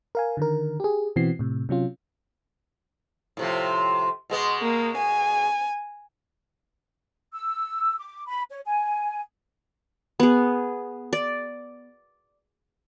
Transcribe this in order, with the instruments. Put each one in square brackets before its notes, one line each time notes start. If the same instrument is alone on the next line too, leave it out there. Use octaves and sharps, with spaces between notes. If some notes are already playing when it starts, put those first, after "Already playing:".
[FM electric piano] A#4 F5 G#5
D3 D#3 A#4
G4 G#4
B2 E3 C4 F#4 C7
A2 C3
C3 F#3 C#4 F4
[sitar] A2 C3 F3
B2 G#3 B3
[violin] A#3
G#5
[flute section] E6
D6
B5
C#5
G#5
[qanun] B3 G#4
D5